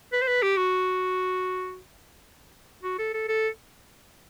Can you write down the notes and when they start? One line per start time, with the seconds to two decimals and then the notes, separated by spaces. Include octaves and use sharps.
0.12 B4
0.22 C5
0.27 B4
0.42 G4
0.57 F#4
2.83 F#4
2.99 A4
3.14 A4
3.28 A4